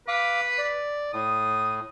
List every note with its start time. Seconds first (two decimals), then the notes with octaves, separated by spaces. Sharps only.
0.08 B4 F5 D6
0.58 D5
1.13 A2 D#6